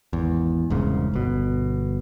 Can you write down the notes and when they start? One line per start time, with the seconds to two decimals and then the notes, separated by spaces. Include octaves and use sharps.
0.13 G#1 E2
0.70 E1 C2 G#2 C#3
1.14 G1 B2